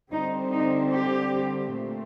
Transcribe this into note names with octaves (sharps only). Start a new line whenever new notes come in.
D3 G3 C4 D#4
D#4
G4
A#2 A3 C4